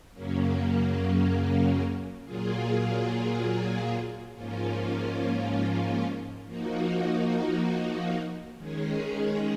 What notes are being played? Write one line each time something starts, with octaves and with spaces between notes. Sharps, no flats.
F#2 C#3 F#3 A#3 C#4
A#2 F#3 A#3 F4 G#4
G#2 F3 A#3 C#4 F4
F3 A#3 D#4 F#4
D#3 G#3 C#4 G#4